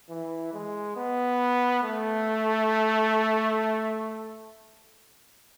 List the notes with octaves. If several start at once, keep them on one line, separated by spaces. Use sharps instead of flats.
E3
G#3
B3
A3